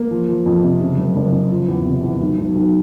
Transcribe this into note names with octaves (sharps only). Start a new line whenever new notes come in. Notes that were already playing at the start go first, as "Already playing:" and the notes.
Already playing: A#3
F3
F3
F2
C3
C#3
F#1
F#1
C#3
F3
E2
C3
E2
B1
B1
B1